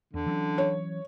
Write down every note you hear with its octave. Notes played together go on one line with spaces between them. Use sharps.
E2 D3
E3 F#3 C#4
C#5